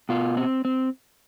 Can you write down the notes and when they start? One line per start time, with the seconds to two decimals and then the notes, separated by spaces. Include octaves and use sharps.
0.09 B2 F4
0.37 C4
0.65 C4